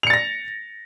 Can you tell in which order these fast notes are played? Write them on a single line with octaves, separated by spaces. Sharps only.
F7 C#7 A6 A#6